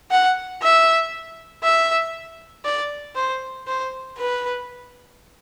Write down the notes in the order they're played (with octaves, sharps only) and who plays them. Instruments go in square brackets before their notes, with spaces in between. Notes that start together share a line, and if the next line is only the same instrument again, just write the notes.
[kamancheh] F#5
E5
E5
D5
C5
C5
B4